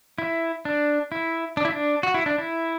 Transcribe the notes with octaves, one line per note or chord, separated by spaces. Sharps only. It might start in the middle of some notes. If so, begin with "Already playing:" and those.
E4
D4
E4
D4
E4
D4
F#4
E4
D4
E4